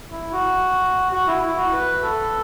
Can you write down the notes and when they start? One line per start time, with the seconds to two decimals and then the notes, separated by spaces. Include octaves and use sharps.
0.11 E4
0.32 F#4
1.12 F#4
1.27 E4
1.42 E4
1.57 F#4
1.73 B4
2.02 A4